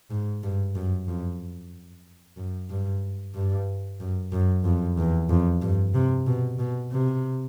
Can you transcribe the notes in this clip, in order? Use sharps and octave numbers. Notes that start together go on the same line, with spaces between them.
G#2
G2
F#2
F2
F#2
G2
G2
F#2
F#2
F2
E2
F2
G2
C3
B2
B2
C3